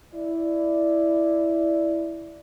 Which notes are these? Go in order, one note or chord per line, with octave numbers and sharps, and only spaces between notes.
E4 D5